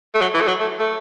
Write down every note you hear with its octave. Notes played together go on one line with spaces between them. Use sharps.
A3
F#3
E3
A3
F#3
A3
A3